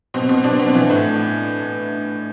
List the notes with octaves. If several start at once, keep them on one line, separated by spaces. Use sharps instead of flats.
B2 C4
B2
B2 D4
B2 C4
D4
E3
A2